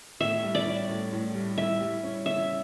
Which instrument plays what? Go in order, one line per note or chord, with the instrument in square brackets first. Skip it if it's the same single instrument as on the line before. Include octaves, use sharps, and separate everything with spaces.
[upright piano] A2 [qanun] E5
[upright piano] G3
[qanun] D5
[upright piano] C#4
A2
A2
G3
[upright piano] E4 [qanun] E5
[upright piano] G3
C#4
[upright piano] C#3 [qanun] E5